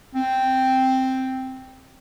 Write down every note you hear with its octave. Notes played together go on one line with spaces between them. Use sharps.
C4